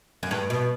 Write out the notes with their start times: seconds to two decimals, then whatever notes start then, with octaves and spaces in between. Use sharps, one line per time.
0.23 F#2
0.31 G2
0.50 B2